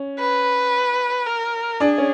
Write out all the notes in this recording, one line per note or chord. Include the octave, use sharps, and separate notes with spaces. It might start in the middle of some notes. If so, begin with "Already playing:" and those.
Already playing: C#4
B4
A#4
D4 G#4
C#4